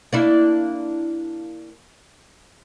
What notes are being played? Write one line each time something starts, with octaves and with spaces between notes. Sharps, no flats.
A#3 D4 E4